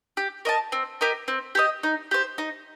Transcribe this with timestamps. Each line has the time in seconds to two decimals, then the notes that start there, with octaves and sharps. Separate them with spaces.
0.17 G4
0.45 A#4 D#5 A5
0.72 C4
1.01 G4 A#4 D#5
1.28 C4
1.55 G4 A#4 D#5
1.83 D#4
2.11 G4 C5
2.38 D#4